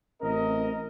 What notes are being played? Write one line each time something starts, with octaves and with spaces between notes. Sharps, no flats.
A1 C4 A#4 D#5